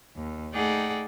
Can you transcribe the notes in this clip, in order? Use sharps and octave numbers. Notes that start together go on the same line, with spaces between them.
D#2
A3 D#4 G#4 D5 F#5 G5